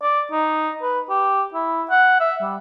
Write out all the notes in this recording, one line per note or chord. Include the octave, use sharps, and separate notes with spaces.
D5
D#4
B4
G4
E4
F#5
E5
G3